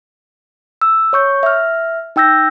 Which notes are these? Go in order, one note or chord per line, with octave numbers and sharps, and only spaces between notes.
E6
C#5 C#6 G6
E5 F6
D#4 G5 E6 G6 A#6